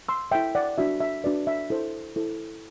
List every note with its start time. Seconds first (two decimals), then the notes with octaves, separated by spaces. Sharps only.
0.09 C6 E6
0.31 E4 A4 C5 E5 G5
0.55 D5 F#5
0.78 D4 F#4 B4 E5
1.00 E5
1.24 D4 F#4 B4 D5
1.47 E5
1.70 E4 A4 C5
2.16 E4 A4 C5